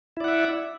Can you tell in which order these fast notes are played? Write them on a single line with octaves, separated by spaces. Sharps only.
E4 D5 F#5 E5